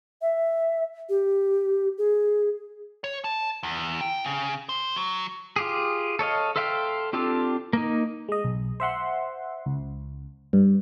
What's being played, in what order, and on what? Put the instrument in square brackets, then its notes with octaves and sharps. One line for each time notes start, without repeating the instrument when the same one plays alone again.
[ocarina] E5
G4
G#4
[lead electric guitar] C#5
A5
E2
G5
C#3
C5
F#3
[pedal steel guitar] F4 G4 G#4
A4 C#5 D#5 F5
A4 C5 E5 F5 G5
C4 D4 F4 G4 A4
A#3 D#4
[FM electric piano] G#3 D#5
B1
C5 E5 F#5 C6
C#2
G2